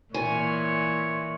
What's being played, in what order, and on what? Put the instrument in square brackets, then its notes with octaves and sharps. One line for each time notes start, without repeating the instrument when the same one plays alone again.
[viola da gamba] A#2 E3 [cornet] C#5 [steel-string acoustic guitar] G#5